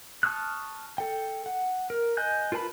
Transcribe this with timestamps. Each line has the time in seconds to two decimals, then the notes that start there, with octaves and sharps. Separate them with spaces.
0.23 A5 C#6 D#6 F6 F#6
0.98 A4 G5
1.46 F#5
1.90 A#4
2.17 D#5 G#5 F#6 G6
2.52 F4 A#4 B4 A5 B5